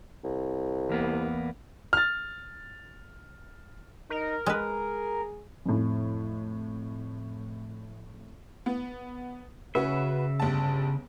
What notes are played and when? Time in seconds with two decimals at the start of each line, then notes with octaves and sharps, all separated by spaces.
0.24 C2
0.90 E2 A#3 B3
1.93 F6 A6
4.10 D#4 A#4
4.46 G#3 G#4 B4
5.66 F2 A2
8.66 B3
9.75 C#3 C#4 F#4 B4 E5
10.40 G1 A5